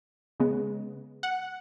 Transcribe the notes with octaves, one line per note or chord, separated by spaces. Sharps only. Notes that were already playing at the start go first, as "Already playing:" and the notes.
C#3 G#3 B3
F#5